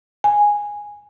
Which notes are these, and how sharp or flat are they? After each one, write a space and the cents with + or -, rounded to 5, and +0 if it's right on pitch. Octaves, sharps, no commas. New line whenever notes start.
G#5 -5